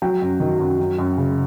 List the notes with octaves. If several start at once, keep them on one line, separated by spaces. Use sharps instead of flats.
F#3 G5
F#2
D#3
F#2
F#3
F#2
C#3